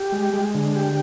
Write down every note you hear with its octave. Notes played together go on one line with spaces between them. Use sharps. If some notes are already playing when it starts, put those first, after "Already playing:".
Already playing: G4
G#3
G#3
D3
G4